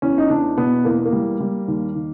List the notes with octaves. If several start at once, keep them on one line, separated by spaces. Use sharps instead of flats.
E2 C#4
D#4
E2 D4
B2 B3
E2 A#3
A#3
G3
G3
D#2
D#3